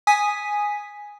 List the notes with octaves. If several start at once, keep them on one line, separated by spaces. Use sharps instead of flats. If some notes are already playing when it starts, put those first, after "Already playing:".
G#5 D#6 B6